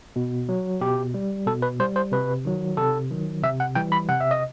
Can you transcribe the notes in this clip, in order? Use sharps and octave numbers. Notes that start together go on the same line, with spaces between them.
B2
F#3
B2 G4
G3
B2 A4
B4
G3 C5
C5
C3 B4
D#3 F#3
C3 A4
D#3 F#3
C3 E5
F#5
E3 G3 G5
B5
C3 F#5
E5
D#5